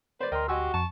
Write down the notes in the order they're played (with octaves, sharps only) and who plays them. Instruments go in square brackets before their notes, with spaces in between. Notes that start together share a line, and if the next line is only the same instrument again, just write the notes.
[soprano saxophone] B4 [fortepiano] C5 D5
[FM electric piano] D2 C6 [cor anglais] A#4 [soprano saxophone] D#5 [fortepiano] G5
[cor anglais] F#4 [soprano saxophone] G4 [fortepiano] D#5 G#5 E6
[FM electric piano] F2 C#6 [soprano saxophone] A5